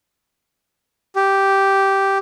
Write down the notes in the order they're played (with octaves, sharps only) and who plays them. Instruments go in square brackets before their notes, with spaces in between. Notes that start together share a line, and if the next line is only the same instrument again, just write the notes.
[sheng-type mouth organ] G4